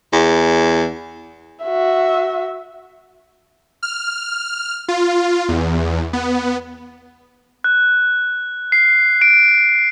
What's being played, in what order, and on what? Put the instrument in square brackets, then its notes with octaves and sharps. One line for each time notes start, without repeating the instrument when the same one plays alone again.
[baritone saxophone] E2
[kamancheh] F#4 E5
[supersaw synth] F6
F4
E2
B3
[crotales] F#6
C7
D7